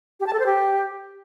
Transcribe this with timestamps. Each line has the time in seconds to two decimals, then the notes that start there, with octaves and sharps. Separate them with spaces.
0.20 G4
0.27 A5
0.33 A4
0.40 C5
0.46 G4